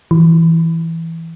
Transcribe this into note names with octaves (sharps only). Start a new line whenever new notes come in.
E3